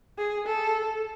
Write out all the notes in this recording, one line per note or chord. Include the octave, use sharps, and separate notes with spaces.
G#4
A4